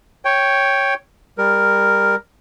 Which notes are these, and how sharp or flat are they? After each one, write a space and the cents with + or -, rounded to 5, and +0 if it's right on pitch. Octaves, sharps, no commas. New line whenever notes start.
C#5 +0 G5 +0
G3 +25 A#4 +0